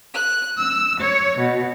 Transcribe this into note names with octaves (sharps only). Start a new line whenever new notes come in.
F#6
E6
C#5
B2